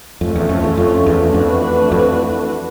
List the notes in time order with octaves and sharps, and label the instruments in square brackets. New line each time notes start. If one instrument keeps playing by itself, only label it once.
[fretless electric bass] F2 [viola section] A3 C#4 F4
[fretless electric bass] E2
F2
E2
F2
E2
[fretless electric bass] F2 [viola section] E3 A3 D4 F#4 B4
[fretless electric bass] F2